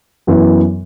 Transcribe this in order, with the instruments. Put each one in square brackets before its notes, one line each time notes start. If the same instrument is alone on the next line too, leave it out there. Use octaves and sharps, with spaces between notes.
[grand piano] F#2 E3 B3